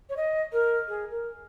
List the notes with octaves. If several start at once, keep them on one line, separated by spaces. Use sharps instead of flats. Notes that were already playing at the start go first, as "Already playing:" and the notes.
C#5
D#5
A#4
G#4
A#4